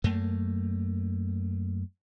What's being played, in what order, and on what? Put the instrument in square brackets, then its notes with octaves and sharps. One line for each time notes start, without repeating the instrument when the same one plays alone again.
[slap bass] F#2 A3 A#3